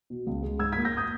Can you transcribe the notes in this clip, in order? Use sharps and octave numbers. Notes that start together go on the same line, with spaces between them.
B2
C#2
G#3
G#2 E6 G#6
G#6 B6
A#3
G6 A#6
D#6 G6